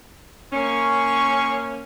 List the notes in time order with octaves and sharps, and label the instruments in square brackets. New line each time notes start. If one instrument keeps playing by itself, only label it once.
[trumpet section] G#3 C#6 [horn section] A#3 C#4